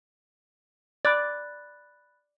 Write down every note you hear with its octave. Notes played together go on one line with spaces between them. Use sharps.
D5 B5 F#6 A6